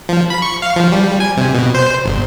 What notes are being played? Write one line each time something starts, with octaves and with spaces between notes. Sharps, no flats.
F3
B5
C#6
F5
F3
G3
G#5
C3
B2
C5
G1